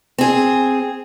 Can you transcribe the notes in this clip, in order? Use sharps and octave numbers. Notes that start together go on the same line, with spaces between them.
C4 G#4